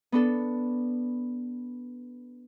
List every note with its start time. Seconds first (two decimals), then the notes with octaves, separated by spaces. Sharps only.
0.12 B3 D4 A4